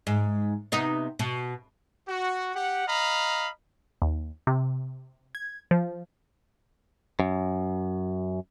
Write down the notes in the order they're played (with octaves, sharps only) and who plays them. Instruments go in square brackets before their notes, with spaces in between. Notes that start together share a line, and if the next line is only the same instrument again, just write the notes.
[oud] G#2
C3 B3 D#4
B2
[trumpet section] F#4
G4 F#5
D#5 F5 A#5 B5
[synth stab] D#2
C3
G#6
F3
[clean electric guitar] F#2